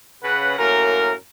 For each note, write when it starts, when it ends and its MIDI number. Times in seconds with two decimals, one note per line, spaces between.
0.23 0.56 49
0.23 0.56 71
0.23 0.56 78
0.59 1.13 42
0.59 1.13 45
0.59 1.13 58
0.59 1.13 70